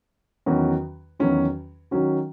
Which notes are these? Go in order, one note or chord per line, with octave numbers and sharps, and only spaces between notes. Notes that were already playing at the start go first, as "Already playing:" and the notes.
E2 D#3 F#3 C#4 F#4
E2 D#3 F#3 C#4 F#4
D#3 F#3 C#4 F#4